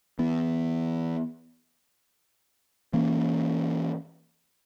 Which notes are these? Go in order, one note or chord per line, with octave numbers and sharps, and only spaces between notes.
E3 B3
E3 A#3 C#4